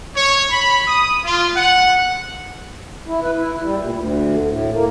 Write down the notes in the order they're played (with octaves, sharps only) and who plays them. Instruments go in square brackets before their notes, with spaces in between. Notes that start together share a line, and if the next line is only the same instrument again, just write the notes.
[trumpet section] C#5
B5
D#6
F4
F#5
[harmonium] E4
B4
E4
G3
A#2
D2
A2
A#3